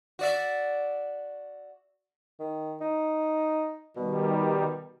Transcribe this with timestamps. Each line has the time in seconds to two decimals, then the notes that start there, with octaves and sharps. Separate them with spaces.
0.19 F#4 D5 E5
2.39 D#3
2.81 D#4
3.97 B2 D#3 G3